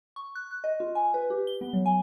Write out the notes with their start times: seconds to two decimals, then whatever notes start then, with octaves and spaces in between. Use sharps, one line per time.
0.16 C#6
0.35 F#6
0.51 F#6
0.64 D#5
0.80 F4
0.95 G#5
1.14 B4
1.30 G4
1.47 G7
1.61 B3
1.73 F#3
1.86 G#5